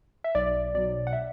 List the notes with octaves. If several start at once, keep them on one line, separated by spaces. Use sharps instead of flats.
E5
B1 D5
B2 F#3 D5
F#5
E5